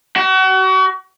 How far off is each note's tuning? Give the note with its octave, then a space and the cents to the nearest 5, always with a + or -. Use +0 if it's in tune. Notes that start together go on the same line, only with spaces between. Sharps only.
F#4 +35